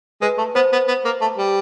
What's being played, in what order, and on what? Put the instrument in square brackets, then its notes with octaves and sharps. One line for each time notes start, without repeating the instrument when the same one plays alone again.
[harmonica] G#3 [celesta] B4
[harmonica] A3
[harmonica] B3 [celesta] C5
[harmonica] B3
B3
A#3
A3
G3